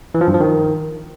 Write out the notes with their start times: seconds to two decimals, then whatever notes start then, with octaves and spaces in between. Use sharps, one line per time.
0.15 E3
0.21 F3
0.27 G2
0.34 F3
0.40 D#3